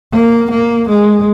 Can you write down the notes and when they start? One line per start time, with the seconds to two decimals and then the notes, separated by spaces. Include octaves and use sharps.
0.13 A#3
0.51 A#3
0.89 G#3